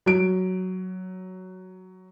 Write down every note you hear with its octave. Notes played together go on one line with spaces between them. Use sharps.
F#3 D7